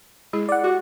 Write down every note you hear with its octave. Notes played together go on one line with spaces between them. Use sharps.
G#3 E4 G#4
D5 F#5
F#4 G4